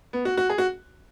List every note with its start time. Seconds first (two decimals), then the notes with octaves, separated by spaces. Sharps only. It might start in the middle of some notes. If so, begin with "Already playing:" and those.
0.13 B3
0.25 F#4
0.37 F#4
0.50 G#4
0.58 F#4